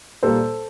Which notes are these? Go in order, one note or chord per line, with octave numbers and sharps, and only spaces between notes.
A#2 G3 A#3 A4 C5